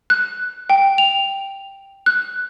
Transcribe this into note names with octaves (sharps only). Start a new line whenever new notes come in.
F#6
G5
F7
F#6